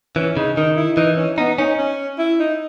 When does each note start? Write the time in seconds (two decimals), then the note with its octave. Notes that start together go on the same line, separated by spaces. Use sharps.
0.16 E3 C#4
0.37 C#3 D#4
0.56 D#3 D#4
0.76 E4
0.97 E3 D#4
1.17 C#4
1.37 B3 D#4
1.58 C#4 D#4
1.78 C#4
2.19 E4
2.40 D#4